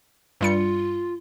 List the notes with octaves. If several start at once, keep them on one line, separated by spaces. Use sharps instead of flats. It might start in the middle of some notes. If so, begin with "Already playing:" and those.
G2 G3 F4 C#7